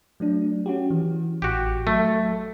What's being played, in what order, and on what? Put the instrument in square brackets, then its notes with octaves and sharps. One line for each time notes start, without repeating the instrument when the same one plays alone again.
[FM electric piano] F#3 A3 D4
C#4 F#4 G4
E3
[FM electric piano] A1 [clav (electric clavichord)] F#4 G4
[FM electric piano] F#3 [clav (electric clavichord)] A3